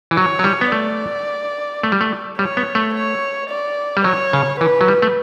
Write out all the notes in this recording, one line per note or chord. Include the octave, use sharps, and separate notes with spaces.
E3
F#3 C#5
F#3
G3
B3
A3 D5
A3
G3
A3
G3 C#5
B3
A3
C#5
D5
G3
F#3 C#5
C#3
E3 B4
F#3
G3
A3